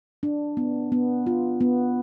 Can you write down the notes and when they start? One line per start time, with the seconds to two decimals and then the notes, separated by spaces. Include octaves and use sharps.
0.23 D4
0.57 B3
0.92 B3
1.27 F4
1.61 B3